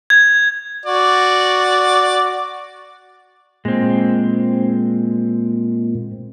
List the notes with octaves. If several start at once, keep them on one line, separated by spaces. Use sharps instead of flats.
G#6
F#4 D5
A#2 G#3 C4